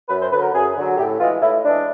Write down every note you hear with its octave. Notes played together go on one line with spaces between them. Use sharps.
F#2 B4
C5
D3 F#3 B4
A#4
F#2 G#4
D3 F#3
A2 G4
E3 G#3 F4
A2 E4
E3 G#3 D4